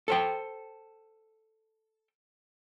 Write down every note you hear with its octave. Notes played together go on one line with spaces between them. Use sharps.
A4 C5 G5